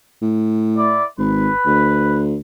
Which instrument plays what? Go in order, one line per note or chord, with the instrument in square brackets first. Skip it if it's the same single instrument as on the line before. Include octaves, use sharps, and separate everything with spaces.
[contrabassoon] A2
[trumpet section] E4 D5
[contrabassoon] G#1 [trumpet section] B4
[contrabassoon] D2